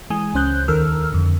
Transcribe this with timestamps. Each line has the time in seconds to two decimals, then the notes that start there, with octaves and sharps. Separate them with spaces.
0.10 E3 G#3 G#5 D#6
0.34 C#2 C#4 C5 F#6 G6
0.68 D#2 D#3 A4 A#4 E6 F6
1.12 F2 D3